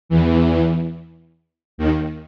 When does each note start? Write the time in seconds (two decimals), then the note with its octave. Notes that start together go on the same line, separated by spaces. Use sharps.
0.09 E2 E3
1.78 D#2 D#3